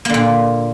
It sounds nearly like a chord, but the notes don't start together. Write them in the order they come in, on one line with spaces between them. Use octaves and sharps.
A#3 D3 A#2